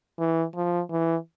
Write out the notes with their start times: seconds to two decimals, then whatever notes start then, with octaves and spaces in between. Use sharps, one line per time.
0.19 E3
0.55 F3
0.91 E3